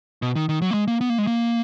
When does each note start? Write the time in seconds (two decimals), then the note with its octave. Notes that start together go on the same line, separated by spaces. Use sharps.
0.22 B2
0.36 D#3
0.49 D#3
0.62 F#3
0.71 A#3
0.74 G#3
0.88 A#3
1.01 B3
1.10 A#3
1.18 G#3
1.27 A#3